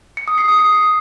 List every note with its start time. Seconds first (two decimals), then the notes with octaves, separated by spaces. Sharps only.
0.17 C#7
0.28 D#6
0.38 C7
0.48 D#6
0.59 C7